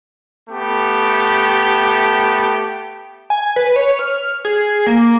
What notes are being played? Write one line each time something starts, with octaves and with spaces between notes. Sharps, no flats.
A3 B3 G4
G#5
B4
C#5
F6
G#4
A#3